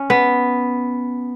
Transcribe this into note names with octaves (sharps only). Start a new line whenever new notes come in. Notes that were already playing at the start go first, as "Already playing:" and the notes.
Already playing: C#4
B3